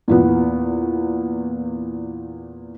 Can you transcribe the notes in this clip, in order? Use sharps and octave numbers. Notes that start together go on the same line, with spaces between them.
E2 A#2 B3